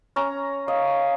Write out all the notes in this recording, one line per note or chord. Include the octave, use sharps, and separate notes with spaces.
C#4 A#5
C#5 D#5 F5